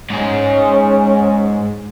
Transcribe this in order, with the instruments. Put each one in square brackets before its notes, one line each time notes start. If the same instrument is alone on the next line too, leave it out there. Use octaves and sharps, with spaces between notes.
[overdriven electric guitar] G#2 G#4 [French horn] C#4